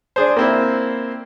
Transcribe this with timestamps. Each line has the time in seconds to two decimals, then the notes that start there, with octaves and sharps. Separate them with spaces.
0.16 D4 G#4 C5
0.37 A#3 C4 E4